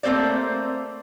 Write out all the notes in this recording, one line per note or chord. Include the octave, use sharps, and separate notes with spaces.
A3 A#3 C4 C5 D5